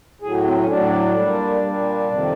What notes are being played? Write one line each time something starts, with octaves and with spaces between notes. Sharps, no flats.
A2 F#3 G#4
C4
C#4
A2 F#3 D4
A#2 G3
A#2 G3
F2 C3 D#3